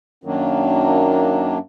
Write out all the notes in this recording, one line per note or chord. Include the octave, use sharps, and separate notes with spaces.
F#2 D#3 F#3 A#3 D4